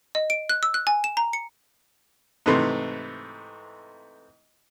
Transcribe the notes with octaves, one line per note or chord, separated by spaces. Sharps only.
D#5
D7
F#6
E6
F#6
G#5
E7
A#5
C#7
G#2 C3 E3 A3 C6